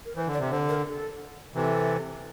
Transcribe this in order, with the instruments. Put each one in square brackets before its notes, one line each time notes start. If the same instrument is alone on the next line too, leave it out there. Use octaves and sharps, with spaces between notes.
[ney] A#4
[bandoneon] E3 [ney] C5
[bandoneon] D3
[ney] D5
[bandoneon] C3
[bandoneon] D3 [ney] C5
[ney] A#4
A4
[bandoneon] C3 E3 [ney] A4